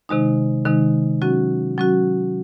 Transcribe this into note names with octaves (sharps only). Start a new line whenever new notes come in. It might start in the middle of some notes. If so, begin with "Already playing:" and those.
C3 D#3 G#3 D#4
C3 D#3 G#3 D#4
F#3 C#4 F#4
F#3 C#4 F#4